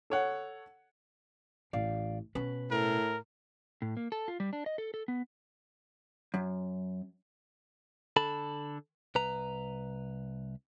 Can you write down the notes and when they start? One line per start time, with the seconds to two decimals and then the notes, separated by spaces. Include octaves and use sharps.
0.10 A4 C#5 F#5
1.73 A1 D5 F5
2.35 B2 C#4 B4
2.71 A2 A#4
3.82 A2
3.97 A#3
4.12 A4
4.28 F4
4.40 G3
4.53 D4
4.66 D#5
4.78 A4
4.94 A4
5.08 B3
6.34 F#2
8.17 D3 A4 A5 B5
9.15 C2 B4 A#5